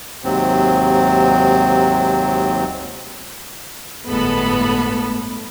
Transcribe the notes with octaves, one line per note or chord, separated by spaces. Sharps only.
D#2 G#2 C3 F#3 C4
G1 A2 G#3 B3 A4 B5